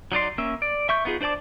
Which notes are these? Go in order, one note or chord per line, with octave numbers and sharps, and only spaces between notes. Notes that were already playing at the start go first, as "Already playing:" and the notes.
F#3 D#4 D5 C6
A#3 C#4 E5
D5
E5 C#6 G6
B3 D#4 F4 G#4
D4 C5 D5 A5 D6